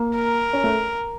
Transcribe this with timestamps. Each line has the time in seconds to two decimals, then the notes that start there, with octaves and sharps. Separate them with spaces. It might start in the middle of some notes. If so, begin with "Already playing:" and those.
Already playing: A#3
0.15 A#4
0.53 C#4
0.64 A3